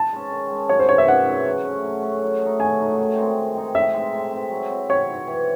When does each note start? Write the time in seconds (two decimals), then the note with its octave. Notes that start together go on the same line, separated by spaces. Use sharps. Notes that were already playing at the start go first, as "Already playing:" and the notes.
Already playing: A5
0.12 G#3 C#4
0.32 D#3
0.51 G#3 C#4
0.69 F#2 C#5
0.80 C5
0.89 C#3 E3 C#5
0.98 E5
1.08 F#2 F#5
1.27 C#3 E3
1.46 F#3
1.65 A3 C#4
1.84 F#3
2.03 A3 C#4
2.22 F#3
2.41 A3 D#4
2.60 F#3 G#5
2.79 A3 D#4
2.98 D#3
3.18 G#3 C4 D#4
3.36 D#3
3.56 G#3 C4 D#4
3.74 A2 E5
3.93 G#3 C4
4.13 A2
4.32 G#3 C4
4.51 F#3
4.70 C4 E4
4.89 F#3 C#5
5.08 C4 E4
5.27 E3